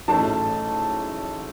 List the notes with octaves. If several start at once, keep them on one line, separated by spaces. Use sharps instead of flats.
A1 G#2 F#3 A3 A5